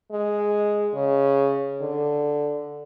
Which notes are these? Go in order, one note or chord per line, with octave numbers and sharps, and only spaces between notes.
G#3
C#3
D3